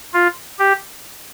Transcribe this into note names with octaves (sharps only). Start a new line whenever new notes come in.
F4
G4